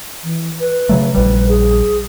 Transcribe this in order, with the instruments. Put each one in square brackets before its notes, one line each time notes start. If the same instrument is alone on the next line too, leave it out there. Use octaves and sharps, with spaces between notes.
[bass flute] E3
B4
[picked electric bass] C#3 F#3 A3
[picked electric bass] A#1 G3 [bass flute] B4
[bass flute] G#4